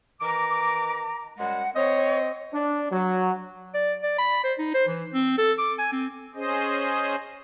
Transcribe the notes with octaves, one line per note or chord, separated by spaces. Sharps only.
D#3 E3 A#5 D6
F#2 G3 G#3 F#5
C4 C#5 D#5
D4
F#3
D5
D5
B5
C5
D#4
C5
E3
C4
A4
D6
G#5
C4
C#4 G#4 C5 D#5